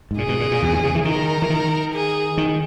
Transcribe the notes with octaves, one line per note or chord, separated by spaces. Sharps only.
G#2
A#2 G#4
B2
A#2
A#2
E2
G2
C#3
E3
D#3 A#4
E3
D#3
G#4
D#3